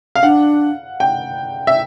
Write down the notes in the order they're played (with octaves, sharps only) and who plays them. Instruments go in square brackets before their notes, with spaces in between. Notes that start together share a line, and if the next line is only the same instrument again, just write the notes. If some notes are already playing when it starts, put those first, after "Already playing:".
[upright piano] F5
[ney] D4 [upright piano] F#5
[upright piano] G5
E5